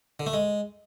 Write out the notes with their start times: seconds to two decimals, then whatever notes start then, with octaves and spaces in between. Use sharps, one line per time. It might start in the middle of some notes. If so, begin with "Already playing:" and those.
0.20 D3
0.27 A3
0.33 G#3